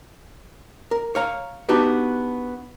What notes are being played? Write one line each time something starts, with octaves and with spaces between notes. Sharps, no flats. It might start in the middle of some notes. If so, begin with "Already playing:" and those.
A#4
C#5 F5 A#5
B3 D4 D#4 F#4 G4 B4